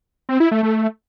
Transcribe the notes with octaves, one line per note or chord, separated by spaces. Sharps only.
C4
E4
A3
A3